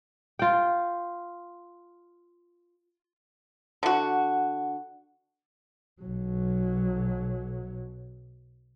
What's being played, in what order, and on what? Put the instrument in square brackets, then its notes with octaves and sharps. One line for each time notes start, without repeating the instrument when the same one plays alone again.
[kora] F4 G5
[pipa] D3 F#4
[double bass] B1 F#3